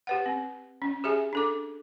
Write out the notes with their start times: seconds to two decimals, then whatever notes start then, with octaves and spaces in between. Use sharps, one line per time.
0.07 G4 B4 F#5
0.26 C4
0.82 C#4
1.04 G4 G#4 E5 G#5
1.33 D4 A4 D6